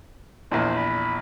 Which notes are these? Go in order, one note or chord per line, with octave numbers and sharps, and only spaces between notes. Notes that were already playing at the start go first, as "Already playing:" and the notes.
A#1 E2 C5
B5